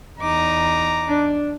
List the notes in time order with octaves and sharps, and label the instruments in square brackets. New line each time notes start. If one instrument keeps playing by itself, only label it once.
[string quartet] E2 D#4 D6 [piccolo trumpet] A#5
[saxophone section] D4